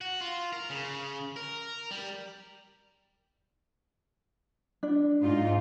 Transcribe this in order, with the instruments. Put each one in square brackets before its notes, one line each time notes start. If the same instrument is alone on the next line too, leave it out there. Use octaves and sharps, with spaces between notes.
[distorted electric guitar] F#4
F4
A#4
C#3
A#4
G3
[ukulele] D4
[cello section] G#2 D#4 F4